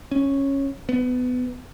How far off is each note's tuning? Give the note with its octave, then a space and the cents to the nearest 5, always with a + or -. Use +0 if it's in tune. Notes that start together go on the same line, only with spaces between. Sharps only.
C#4 -10
B3 +20